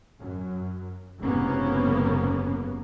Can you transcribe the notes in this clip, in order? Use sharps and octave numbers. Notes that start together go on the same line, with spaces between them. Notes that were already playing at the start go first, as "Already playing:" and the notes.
F#2
F#1 G#2 C3 A#3 B3 C#4